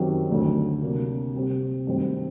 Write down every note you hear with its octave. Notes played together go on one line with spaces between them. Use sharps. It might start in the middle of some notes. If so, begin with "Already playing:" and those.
Already playing: F#2 D#3 F#3 C4 G4
D2 D3 F#3 A3
C3 F#3 A#3 D4
C3 G3 C4 G4
G2 D#3 F#3 A3 C4